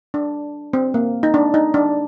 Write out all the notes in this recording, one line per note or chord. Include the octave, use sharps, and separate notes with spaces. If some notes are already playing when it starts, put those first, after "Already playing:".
D4
C4
A#3
D#4
D4
D#4
D4